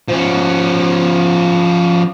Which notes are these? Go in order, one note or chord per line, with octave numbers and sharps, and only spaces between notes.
F3 C#4